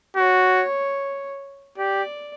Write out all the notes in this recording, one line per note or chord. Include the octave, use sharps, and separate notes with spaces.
F#4 C#5
G4 D5